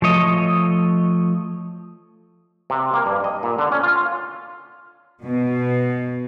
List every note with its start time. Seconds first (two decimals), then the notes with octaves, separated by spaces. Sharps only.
0.02 F3 A3 C#5 D#5
2.70 C3
2.94 A#3
3.06 G2
3.24 D#5
3.43 A#2
3.58 D3
3.72 C#4
3.83 F4
5.23 B2